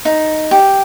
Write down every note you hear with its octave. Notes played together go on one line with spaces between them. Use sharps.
D#4
G4